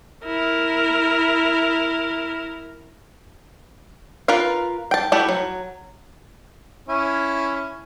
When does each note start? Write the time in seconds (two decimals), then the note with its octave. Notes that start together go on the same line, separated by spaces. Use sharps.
0.24 E4 A#4
4.28 F4 A#4 B4 F5
4.91 G5 A5
5.12 A3 E4 F#4 G4
5.29 F#3
6.89 C#4 E4